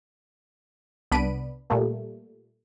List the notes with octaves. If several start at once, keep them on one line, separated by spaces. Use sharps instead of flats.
C2 B3 D4 B5 D7 D#7
A#2 G3 A3 A#3